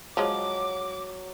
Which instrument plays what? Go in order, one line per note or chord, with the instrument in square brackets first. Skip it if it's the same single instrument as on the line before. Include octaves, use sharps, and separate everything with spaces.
[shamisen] F3 G#3 [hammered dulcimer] F#3 [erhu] D6